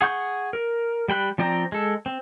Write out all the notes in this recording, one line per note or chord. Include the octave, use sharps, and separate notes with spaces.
G#4 F#5 C#6 G6
A#4
G3 G5 B5 F#6
F3 C4 D5 G5 A#5
G#3 A4
C4